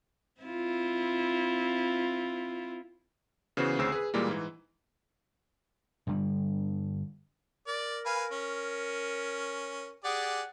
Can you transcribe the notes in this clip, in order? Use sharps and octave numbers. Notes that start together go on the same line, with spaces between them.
C4 E4 F4
C#3 E3 B3 F#4 C5
D2 C#3 C4 C5 E6
G#4 B4
A#2 E3 G3 G#3 A#3
G#2 E3
G2 D3 G3
A#4 D5
B4 F5 G#5
C#4
G4 G#4 D5 F#5